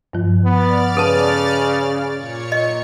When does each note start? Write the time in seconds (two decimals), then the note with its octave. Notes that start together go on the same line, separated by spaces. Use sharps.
0.13 G2 F3
0.44 B3 D5 F6 A6
0.97 C#3 A4 B4 A5
2.13 A#2 C#5 C#7
2.52 D#5